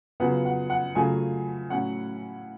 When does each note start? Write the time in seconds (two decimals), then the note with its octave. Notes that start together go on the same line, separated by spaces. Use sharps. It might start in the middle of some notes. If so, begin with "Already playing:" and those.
0.20 C#3 F#3 B3 F4 F#5
0.45 F#5
0.70 F#5
0.95 C#3 F#3 A3 F4 G#5
1.70 A2 F#3 C#4 F#5